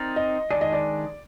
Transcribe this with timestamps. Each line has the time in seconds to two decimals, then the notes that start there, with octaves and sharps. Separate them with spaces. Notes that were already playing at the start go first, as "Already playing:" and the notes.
Already playing: C4 D#4 A#4 D5
0.16 D#5
0.51 D#3 G#3 D4 G#4 D5
0.61 D#5
0.73 D5